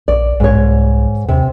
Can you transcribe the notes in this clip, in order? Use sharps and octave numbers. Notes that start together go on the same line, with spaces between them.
A#1 D5
B1 G#2 C#5
C2
D#2 C3